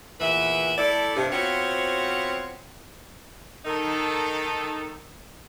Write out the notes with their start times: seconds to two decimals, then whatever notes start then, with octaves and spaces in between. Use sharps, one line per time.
0.20 E2 A#2 E3 B4 E5
0.77 A3 E4 A4 D5
1.16 G2 C3
1.32 B3 C4 F4 F#4 C5 C#5
3.65 D#3 D#4 A4